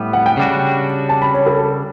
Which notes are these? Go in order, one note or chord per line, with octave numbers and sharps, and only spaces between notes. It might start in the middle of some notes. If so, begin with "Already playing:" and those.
Already playing: A2 G3 B3
F#5
G5
C#3 G3 D4 F#4
A5
B5
C#5
A4